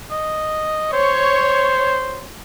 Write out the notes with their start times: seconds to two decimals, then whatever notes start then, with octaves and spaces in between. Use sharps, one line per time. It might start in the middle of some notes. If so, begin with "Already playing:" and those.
0.11 D#5
0.93 C5 C#5